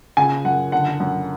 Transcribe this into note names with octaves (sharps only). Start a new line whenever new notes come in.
C#3 G#5
F#2 F#5
D3 F#5
F#2